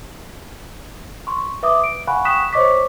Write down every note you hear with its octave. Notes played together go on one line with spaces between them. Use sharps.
C6 C#6
B4 E5 D6 D#6
D7
F5 F#5 G#5 B5 C#6 F#6
G5 C#6 D#6 F#6 B6 E7
C5 C#5 D#5 C#6 D6 B6